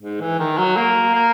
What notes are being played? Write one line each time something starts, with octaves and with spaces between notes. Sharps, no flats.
G#2
E3
D#3
F#3
A#3
A#3